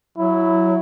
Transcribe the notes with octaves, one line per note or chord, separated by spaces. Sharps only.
F#3 E4